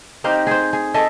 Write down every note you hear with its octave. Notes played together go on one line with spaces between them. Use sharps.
C4 D#4 G4 F5
G#4 C5
G#4
A4 D#5 E5